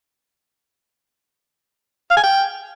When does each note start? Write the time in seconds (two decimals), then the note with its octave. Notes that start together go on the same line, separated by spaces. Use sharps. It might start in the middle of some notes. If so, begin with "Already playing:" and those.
2.11 F5
2.17 G#5
2.23 G5